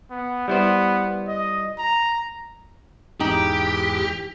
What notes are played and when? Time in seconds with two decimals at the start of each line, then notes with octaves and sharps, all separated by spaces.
0.11 B3
0.48 G3 B3 E4 C5
1.27 D#5
1.78 A#5
3.20 E2 G#2 D#4 G4